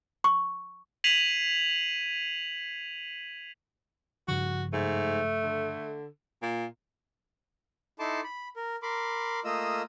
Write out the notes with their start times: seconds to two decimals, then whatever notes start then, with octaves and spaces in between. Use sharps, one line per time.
0.24 C#6
1.04 G#6 B6 C7 D#7 F7 F#7
4.28 G2 C#3 F3 F#4
4.73 G#2 A3
5.43 D3
6.42 A#2
7.99 D#4 E4 A4 A5 C6 D6
8.24 B5
8.56 A#4
8.83 A#4 B5 C6 D6
9.45 A3 A#3 F4 D#5 D#6 E6